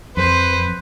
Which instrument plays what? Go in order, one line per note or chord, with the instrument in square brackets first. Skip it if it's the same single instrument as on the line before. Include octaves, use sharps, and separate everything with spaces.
[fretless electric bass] F2 [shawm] B4 [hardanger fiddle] C5